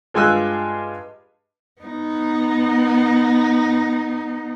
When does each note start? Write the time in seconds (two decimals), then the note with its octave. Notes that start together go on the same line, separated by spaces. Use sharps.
0.14 G2 G#3 F4 G#5 E6 F#6
1.82 B3 D#4